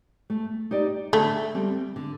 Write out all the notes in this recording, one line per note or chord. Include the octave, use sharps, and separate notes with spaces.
A3
D#4 G4 D5
D3 A3
G3 C4
D3